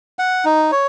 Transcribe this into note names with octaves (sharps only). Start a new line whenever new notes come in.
F#5
D#4
C#5